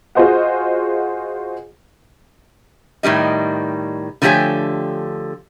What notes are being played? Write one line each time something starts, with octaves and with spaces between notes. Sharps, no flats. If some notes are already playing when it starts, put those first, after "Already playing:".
F4 F#4 G#4 C5 D#5 F#5
A2 D#3 G3 D#5
D3 F3 A3 G4 C#5 G#5